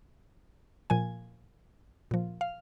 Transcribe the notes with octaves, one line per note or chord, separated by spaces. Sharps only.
A#2 F3 G#5
A#2 F3
F5